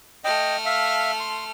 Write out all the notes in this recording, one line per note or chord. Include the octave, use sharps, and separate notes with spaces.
A3 D#5 G5 F6
E5 F5
C6